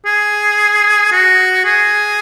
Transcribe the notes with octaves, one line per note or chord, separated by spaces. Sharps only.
G#4
F#4
G#4